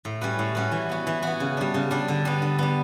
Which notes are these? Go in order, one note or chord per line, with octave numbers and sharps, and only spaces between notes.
A2
G3 C#4 F#4 B4
A2
G3 C#4 F#4 B4
E3
B3 F#4
E3
B3 F#4
C#3
G3 D4
C#3
G3 D4
D3
G3 B3
D3
G3 B3